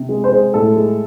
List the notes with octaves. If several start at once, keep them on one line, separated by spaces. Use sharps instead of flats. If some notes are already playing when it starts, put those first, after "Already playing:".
Already playing: C3
G#3
C5
G#3
A2 A4
G#3